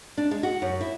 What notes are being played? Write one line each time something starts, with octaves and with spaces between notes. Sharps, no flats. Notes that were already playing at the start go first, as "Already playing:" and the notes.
D4
G#3
F#4
F#2
E4